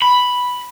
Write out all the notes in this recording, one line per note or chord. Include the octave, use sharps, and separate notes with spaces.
B5